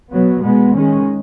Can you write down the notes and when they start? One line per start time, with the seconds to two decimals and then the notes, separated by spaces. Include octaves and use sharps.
0.11 B2 F#3 B3
0.44 B2 G#3 B3
0.75 D#3 G#3 C#4